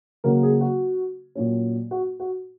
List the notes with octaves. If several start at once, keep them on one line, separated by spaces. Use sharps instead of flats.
C#3 F#3 A#3 C#4 A#4
G#4
F#4
A#2 F#3 A#3 C#4
F#4
F#4